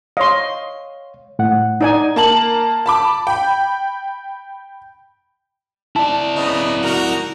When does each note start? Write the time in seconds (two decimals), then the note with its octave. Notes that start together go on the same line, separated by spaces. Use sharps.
0.17 C#5 D#5 F5 C6
1.39 A2 F#5
1.81 D#4 D5 G#5
2.16 A#3 A5 F#7
2.86 A5 B5 D6
3.27 G5 B5
5.96 E4 D5 A5
6.37 C#3 B3 D#5
6.83 F#4 A#4